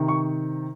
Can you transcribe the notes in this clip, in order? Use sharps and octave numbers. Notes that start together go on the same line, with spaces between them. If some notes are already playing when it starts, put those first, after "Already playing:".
Already playing: C3 D#3
C#6